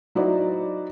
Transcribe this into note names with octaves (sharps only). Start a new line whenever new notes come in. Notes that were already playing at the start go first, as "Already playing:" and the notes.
F#3 D#4 E4 F#4 C5 D5